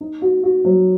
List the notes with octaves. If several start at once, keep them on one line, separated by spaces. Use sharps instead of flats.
D#4
F#4
F#4
F#3